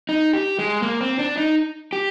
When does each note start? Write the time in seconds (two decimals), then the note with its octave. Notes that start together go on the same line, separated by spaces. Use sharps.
0.09 D#4
0.33 G4
0.59 G#3
0.83 A#3
1.01 C4
1.19 D4
1.37 D#4
1.93 G4